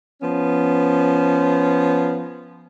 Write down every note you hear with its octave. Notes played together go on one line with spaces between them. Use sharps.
F3 B3 C#4